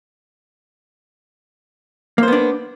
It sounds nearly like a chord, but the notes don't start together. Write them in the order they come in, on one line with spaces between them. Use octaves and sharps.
A#3 C5 B3 D4